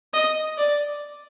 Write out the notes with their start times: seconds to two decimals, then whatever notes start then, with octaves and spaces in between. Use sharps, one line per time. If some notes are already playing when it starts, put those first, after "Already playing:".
0.14 D#5
0.58 D5